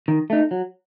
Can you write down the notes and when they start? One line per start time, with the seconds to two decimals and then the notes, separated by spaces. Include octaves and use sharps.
0.08 D#3
0.30 A3 D#4
0.51 F#3